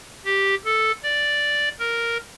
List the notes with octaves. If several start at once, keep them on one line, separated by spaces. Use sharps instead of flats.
G4
A4
D5
A#4